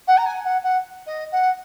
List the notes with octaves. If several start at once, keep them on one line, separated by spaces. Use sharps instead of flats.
F#5
A#5
G#5
F#5
F#5
D#5
F#5